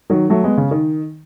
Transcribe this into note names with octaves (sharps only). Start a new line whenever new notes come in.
D#3 F#3
F#3 A3
G#3 B3
C#3
D#3